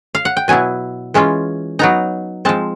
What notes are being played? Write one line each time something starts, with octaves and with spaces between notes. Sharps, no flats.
F5
F#5
G5
B2 F#3 B3 E4 G#5
E3 G#3 C#4 F4
F#3 B3 D#4 A#5
F3 G#3 C4 A5